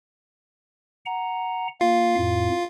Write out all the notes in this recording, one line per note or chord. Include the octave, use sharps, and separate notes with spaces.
F#5 A#5
A#3 F4 F5
F2 A2